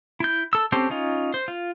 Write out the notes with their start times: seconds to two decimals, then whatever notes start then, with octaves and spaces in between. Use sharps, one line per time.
0.20 E4 G6
0.53 A4 E6
0.72 C4 C#4 G4 A4 C5
0.90 C#4 D#4 F4
1.34 C5
1.48 F4